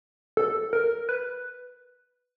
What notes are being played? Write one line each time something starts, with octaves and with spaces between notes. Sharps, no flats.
A4
A#4
B4